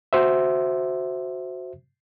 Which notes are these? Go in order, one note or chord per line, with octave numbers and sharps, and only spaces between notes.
F#4 C5 E5